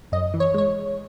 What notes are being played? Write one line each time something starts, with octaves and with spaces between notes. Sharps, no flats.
F#2 D#5
E3
C#5
G#3 C#5